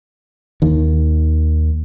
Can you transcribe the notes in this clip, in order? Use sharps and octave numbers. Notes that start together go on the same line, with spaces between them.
D#2 D#3